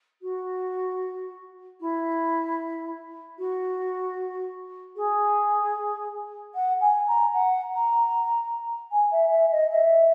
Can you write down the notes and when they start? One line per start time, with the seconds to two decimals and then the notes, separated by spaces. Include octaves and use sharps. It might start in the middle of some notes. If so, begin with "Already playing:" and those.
0.22 F#4
1.80 E4
3.38 F#4
4.96 G#4
6.54 F#5
6.80 G#5
7.06 A#5
7.33 F#5
7.73 A#5
8.91 G#5
9.11 E5
9.31 E5
9.51 D#5
9.70 E5